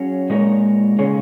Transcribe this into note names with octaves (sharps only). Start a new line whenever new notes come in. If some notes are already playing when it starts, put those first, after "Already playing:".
Already playing: F#3 C#4 G#4 C#5
A#2 G#3 D#4 A#4 C#5
C#3 G#3 C#4 G#4 C#5